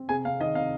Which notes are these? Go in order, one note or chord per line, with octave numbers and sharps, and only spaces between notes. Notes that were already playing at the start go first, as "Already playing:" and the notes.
Already playing: C4
C3 G#4 G#5
C3 F5
D#3 D#5
C3 F5